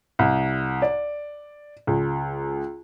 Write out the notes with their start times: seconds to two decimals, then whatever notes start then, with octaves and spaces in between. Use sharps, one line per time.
0.19 C2
0.82 D5
1.87 C#2